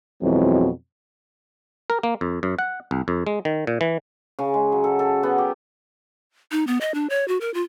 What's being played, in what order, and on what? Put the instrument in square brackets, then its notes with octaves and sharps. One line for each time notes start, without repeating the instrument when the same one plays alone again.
[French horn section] F2 B2 E3 F#3 G#3 C4
[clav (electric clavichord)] A#4
A#3
F2
F#2
F#5
C2
F2
G#3
D#3
A#2
E3
[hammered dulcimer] C#3
G#3
F#3
A4
A4
B3
G4
[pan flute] D#4
B3
D#5
D4
C#5
F#4
A#4
F4